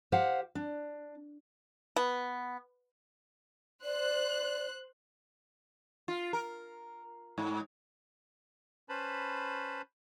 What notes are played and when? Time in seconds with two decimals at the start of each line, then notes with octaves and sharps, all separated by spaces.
0.12 G4 C5 F5 F#5
0.55 D4
1.96 B3
3.84 C5 D5 F#6
6.08 F4
6.33 A#4
7.38 G#2
8.89 C#4 B4 C5 A5 B5